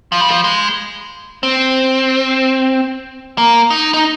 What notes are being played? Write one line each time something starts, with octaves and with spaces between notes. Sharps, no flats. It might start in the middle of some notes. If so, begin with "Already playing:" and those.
F3
G3
F3
G#3
C4
A#3
D#4
D#4